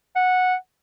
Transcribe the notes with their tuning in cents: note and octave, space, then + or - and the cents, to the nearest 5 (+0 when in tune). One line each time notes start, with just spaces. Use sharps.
F#5 -10